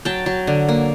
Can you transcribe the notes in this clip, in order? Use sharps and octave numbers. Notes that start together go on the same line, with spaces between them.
F#3 G5 A5
F#3
D3
A#3